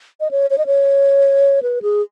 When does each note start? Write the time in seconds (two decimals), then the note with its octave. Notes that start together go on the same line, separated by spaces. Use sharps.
0.20 D#5
0.31 C#5
0.50 C#5
0.58 D#5
0.66 C#5
1.63 B4
1.82 G#4